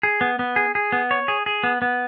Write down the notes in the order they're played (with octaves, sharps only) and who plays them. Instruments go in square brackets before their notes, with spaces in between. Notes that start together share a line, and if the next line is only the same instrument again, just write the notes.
[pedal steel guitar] G#4
B3
B3
G#4
G#4
B3
C#5
G#4
G#4
B3
B3